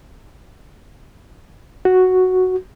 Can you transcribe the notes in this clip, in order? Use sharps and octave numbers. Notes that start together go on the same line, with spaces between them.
F#4